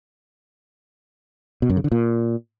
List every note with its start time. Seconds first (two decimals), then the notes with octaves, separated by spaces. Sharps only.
1.62 B2
1.70 F#2
1.77 C#3
1.84 D3
1.92 A#2